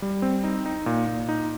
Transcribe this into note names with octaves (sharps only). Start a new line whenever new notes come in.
G3
C4
D#4
D#4
A#2
A#2
D#4